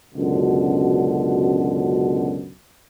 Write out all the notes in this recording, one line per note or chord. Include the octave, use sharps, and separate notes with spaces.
C#2 F#2 B2 D3